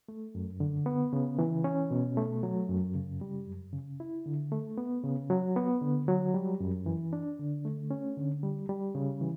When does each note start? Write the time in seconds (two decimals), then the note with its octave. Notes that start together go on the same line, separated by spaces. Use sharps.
0.08 A3
0.35 F#2
0.60 D3
0.86 B3
1.13 C#3
1.39 E3
1.64 C#4
1.91 B2
2.17 A3
2.43 F#3
2.69 F#2
2.95 C#3
3.21 G3
3.48 F#2
3.73 C#3
4.00 E4
4.26 D3
4.52 A3
4.78 B3
5.04 C#3
5.30 F#3
5.56 B3
5.82 D3
6.08 F#3
6.34 G3
6.60 F#2
6.86 E3
7.13 D4
7.39 D3
7.65 A3
7.91 C#4
8.17 D3
8.43 G3
8.69 G3
8.95 C#3
9.21 E3